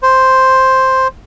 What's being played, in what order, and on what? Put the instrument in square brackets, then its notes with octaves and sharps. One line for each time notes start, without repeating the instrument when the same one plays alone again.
[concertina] C5